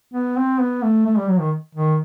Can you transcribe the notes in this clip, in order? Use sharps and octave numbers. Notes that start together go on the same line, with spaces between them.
B3
C4
B3
A3
A3
G3
F#3
D#3
D#3